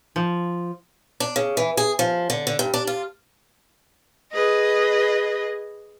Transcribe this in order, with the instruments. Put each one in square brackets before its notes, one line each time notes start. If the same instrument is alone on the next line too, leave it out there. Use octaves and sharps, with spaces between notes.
[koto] F3
[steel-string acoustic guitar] D4
C#3
E3
G#4
F3
D3
D3
G2
D4
F4
[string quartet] G#4 B4 D#5